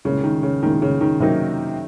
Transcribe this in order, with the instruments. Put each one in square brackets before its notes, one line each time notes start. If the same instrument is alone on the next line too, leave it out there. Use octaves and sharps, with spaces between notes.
[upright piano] C2 A#2 G#3 [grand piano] C#3
[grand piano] D#3
C#3
[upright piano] C2 A#2 G#3 [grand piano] D#3
[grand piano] C#3
D#3
[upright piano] C3 F#3 A#3 D#4